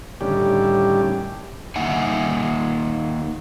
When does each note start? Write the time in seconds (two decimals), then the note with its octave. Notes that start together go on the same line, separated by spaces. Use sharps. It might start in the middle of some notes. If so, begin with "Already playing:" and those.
0.21 A2 D3 D#3 G3 C#4 G4
1.76 D#3 A#3 D#4 E5 F#5 G#5